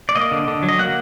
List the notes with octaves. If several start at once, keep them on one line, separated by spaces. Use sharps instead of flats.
D5
A#3 D#5
D3
D3
F#3
D#5
A#3 F#5